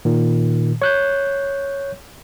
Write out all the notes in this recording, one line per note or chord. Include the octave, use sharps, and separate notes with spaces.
A#2 D#3
C#5 F#6 G6